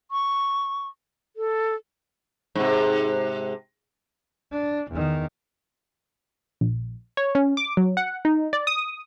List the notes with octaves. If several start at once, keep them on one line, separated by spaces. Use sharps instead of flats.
C#6
A4
G#2 C3
D4
E2 D#3
A#1
C#5
C#4
D6
F#3
F#5
D#4
D5
D#6